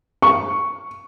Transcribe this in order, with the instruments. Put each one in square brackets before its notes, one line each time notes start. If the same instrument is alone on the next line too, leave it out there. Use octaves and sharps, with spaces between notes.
[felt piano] C#6